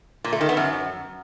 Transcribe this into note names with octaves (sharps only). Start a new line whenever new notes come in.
A#2
A3
D#3
B3
F#2